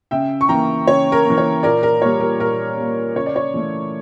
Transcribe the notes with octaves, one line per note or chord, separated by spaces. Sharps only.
C#3 E5 G5
C#6
E3 A#3 G5 A#5
C#3 C#5
A#4
E3 A#3
C#5
A#2 A#4 D5
A#4
G3 A#3 C#5
A#4
A#2 A#4
G3 A#3
C#3 C#5
D5
C#5
E3 A3